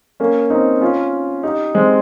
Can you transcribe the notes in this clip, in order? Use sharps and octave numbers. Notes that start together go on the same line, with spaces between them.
A#3 C#4
C4 D#4
C#4 F4
D#4 G4
G#3 C4